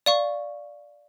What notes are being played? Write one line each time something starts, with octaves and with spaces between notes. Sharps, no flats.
D5 F5 C#6